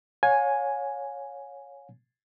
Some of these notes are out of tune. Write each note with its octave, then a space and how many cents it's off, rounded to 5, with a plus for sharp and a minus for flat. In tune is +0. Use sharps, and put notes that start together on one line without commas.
C#5 +0 F5 +45 G#5 +0